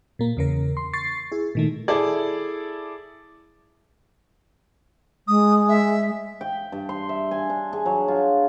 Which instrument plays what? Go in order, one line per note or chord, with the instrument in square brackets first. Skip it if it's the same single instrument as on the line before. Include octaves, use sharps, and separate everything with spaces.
[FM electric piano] A#2 A#3
E2 C#3 A#4
C6
C#6 A6 C7
E4 G#4
A#2 D#3 A3
[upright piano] E4 G#4 A4 D5
[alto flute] G#3 [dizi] D#6
[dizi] E5
[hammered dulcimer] G5
G2
C6
E5
G#5
D4
G#4
F#3
F4